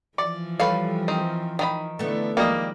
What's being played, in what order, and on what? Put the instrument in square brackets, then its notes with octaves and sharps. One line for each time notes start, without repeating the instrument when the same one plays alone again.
[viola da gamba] E3 F3 [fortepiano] D5
[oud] G3 A4 C#5 [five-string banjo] B4 F5
[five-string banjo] D#3 C4
[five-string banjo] D#3 F4 B5 [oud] D#4
[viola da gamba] D3 D4 E4 [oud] A3 B3
[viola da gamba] D#3 F3 G#3 [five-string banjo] G3 D#5 [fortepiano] A#3